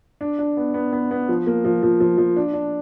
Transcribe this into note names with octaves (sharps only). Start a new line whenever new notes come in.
D4
D4
B3
B3
B3
B3
F3
A#3
F3
F3
F3
F3
D4
D4